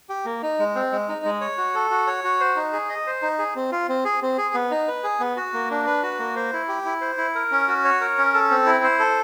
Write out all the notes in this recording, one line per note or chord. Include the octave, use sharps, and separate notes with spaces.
G4
A#3
D#4
G#3
C4
G#3
D#4
G#3
C#5
F#4
A4
F#4
C#5
F#4
C5
D#4
G#4
D#5
C5
D#4
G#4
C4
F4
C4
G#4
C4
G#4
B3
D#4
B4
G#4
B3
F#4
A#3
D4
B4
F#4
A#3
C5
E4
G4
E4
C5
E4
A#4
C#4
F#4
C#5
A#4
C#4
A4
C4
E4
C5
A4